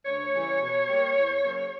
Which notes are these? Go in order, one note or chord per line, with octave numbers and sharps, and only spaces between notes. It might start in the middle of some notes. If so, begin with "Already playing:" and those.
D2 C#5
C#3 E3 G3
B2
G3 A#3
E2
C#3 F#3 A#3